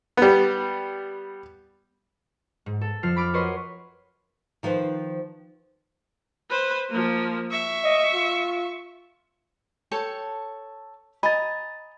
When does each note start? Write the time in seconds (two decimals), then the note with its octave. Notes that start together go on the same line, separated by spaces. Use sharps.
0.17 G3 B3
2.66 G#2
2.81 A4
3.03 F2 F3 F6 C7
3.16 B5 D6 F6
3.33 F#4 A#4 B4 C#5 D#5 C6
4.63 D#3 F3 B4 C5
6.50 B4 C5
6.89 F3 A#3
7.51 E5 C#6
7.84 D#5
8.15 F4
9.92 A4 C#5 G5
11.23 D#5 G#5 A#5 B5 A6